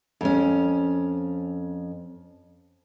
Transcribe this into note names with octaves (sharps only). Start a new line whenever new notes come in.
F2 C#4